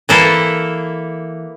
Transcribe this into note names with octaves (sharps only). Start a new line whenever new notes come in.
E3 A#3 E4 A4